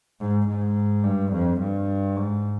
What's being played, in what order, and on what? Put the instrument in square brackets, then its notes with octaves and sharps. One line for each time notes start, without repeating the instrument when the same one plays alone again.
[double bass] G#2
G#2
G2
F2
G2
G#2